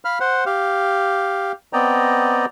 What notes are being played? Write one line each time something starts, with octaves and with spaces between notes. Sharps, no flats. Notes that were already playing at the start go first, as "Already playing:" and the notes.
F5 B5 F6
C5 F#5
G4 F5
B3 C4 D5 D#5 G5 A#5